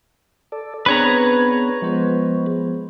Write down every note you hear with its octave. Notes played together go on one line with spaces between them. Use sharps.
A4 D5
B3 C4 D4 G#4 B4 C#5 A#5
F3 G#3 B3 C5